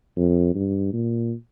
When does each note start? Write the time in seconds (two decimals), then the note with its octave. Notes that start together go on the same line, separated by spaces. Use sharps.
0.17 F2
0.55 G2
0.93 A#2